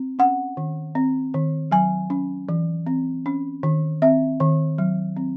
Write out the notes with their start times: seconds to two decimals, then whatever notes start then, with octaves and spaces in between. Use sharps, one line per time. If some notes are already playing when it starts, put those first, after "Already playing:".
Already playing: C4
0.19 C#4 F#5
0.57 D#3
0.95 C4
1.34 D#3
1.71 F#3 G#5
2.10 C#4
2.49 E3
2.87 C4
3.26 C#4
3.63 D#3
4.02 C4 E5
4.40 D#3
4.78 F#3
5.17 C4